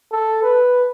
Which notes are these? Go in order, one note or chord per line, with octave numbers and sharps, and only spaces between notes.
A4
B4